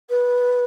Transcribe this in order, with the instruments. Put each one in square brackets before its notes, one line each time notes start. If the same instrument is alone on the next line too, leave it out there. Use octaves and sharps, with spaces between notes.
[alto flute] B4